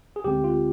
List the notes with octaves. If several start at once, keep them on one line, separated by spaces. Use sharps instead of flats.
G#4
D2 D3 G#3 C4 G4
F4